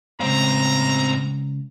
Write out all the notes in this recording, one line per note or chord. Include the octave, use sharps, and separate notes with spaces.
A2 C#3 G#3 C4 F5 A#5